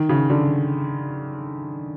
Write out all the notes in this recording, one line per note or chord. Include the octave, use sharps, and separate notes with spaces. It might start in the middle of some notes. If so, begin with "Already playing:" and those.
Already playing: D#3
C#3
D3